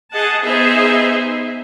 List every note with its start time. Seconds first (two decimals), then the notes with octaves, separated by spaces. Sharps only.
0.11 G#4 D#5 F#5 A5
0.42 B3 D#4 G#4 C5 E5